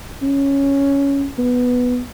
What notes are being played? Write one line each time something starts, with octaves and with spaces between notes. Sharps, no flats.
C#4
B3